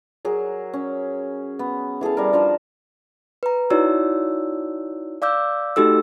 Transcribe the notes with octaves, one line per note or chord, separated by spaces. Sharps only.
F#3 G#4 A#4
C#4
B3
E3 G#4 A4 F5
G3 A#4
F3 D4 C5
B4 A#5
D#4 E4 F#4 C#5 D5 E6
D5 F5 D6 E6 G6
A3 D#4 F#4 G4 A4 E6